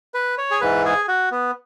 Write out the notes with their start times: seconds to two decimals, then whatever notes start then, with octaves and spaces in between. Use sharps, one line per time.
0.14 B4
0.38 C#5
0.51 G#4
0.61 G#2 E3 B4
0.85 G#4
1.08 F#4
1.31 B3